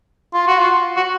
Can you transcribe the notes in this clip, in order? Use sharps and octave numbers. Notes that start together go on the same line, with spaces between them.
F4
F#4
F4
F#4